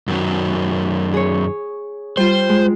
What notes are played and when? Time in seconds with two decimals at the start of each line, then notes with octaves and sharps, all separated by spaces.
0.08 F#2 D#3 F#3
1.14 G#4 C#5
2.17 G3 F4 C5
2.49 G#3